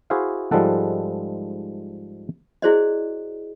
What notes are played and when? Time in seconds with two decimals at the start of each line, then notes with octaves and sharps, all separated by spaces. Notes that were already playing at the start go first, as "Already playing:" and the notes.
0.10 E4 F#4 G#4 C5 E5 F5
0.51 G#2 F3 G3 G#3 A4 F#5
2.62 E4 F#4 G#4 C5 D5 D#5